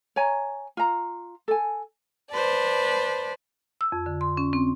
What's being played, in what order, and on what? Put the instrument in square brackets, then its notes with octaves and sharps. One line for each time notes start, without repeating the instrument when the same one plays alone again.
[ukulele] C#5 G#5 A#5
F4 A#5
A4 G#5
[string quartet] B4 C5 D5 A5
[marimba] E6
F2
D3
C6
C#4
C4